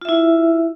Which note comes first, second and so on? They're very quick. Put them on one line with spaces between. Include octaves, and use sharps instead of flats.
F4 E5 E4